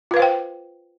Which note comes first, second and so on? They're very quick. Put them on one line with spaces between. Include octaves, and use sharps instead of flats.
F4 B4 F5 C5 G5